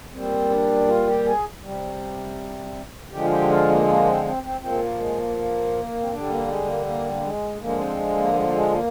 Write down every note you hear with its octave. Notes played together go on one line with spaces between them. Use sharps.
A#2 G3 C4
D4
F4
G4
G#4
C3 G3
D3 F3 G#3 G4
F4
G4
F4
A#3
A#3
C4
C4
C4
A#2 F3 G#3 C4
G#3
A#3
G#3
A#3
A#3
C4
D3 G3 D4
A#3
G#3
A#3
A#3
A#3
G#3
D3 F3 G#3 A#3
C4
A#3
G#3
A#3
G#3
A#3